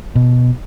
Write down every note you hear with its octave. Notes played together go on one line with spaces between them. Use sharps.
B2